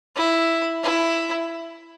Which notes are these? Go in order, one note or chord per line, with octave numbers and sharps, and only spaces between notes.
E4
E4